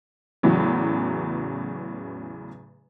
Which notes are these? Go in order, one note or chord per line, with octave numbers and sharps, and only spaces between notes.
E2 A2 C#3 E3 F#3